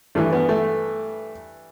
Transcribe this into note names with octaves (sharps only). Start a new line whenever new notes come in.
G2 E3 A3
B3
A3